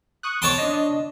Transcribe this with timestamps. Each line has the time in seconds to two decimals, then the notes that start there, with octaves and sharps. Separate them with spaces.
0.23 C#6 D#6 F#6
0.42 C#5 A5 C6 D7
0.58 D4 D#5